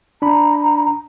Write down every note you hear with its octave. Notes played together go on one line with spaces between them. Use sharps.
D4 A#5 B5